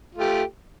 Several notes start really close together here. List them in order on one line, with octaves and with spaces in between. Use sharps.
F4 A3 G4